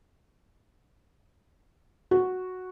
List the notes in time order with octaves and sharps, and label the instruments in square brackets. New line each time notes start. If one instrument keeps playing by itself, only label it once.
[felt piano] F#4